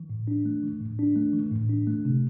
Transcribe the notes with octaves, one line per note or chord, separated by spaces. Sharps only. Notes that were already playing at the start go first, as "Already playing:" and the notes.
Already playing: E3
A2
D4
A3
E3
A2
D4
A3
E3
A2
D4
A3
C3